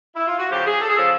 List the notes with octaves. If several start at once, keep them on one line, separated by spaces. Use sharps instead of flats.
E4
F4
F#4
D2 C#3 F3 G4
G#4
A4
G#4
C#3 F3 A4